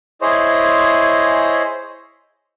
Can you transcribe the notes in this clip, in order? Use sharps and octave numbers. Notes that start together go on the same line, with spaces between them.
E4 G#4 C5 C#5 D#5